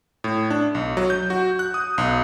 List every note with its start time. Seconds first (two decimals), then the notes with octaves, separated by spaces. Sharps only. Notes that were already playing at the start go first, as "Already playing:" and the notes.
0.24 A2
0.50 D4
0.75 B1
0.97 F#3
1.10 G6
1.30 F#4
1.59 F#6
1.74 D#6
1.98 B1